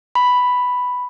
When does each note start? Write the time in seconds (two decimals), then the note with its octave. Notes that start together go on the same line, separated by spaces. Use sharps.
0.15 B5